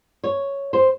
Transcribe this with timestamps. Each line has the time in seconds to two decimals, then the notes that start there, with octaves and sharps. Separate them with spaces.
0.24 C#5
0.73 C5